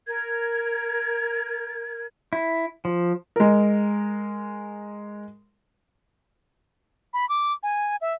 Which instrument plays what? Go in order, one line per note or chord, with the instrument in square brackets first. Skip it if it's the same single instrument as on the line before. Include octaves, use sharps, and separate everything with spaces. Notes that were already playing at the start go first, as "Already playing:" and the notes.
[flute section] A#4 G#6
[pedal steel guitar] E4
F3
[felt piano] G#3 A#4
[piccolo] B5
D6
G#5
E5